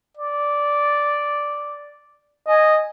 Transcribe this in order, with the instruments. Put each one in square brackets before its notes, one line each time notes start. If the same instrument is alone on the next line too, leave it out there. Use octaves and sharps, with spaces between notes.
[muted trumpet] D5
[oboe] D#5 [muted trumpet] G#5